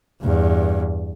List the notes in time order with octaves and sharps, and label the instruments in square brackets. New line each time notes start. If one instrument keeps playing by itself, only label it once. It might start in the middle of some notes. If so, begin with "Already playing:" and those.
[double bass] E2 G2